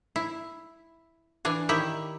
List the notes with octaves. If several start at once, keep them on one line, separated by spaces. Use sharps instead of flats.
E4
E3 D4 G#5
D#3 E4 G4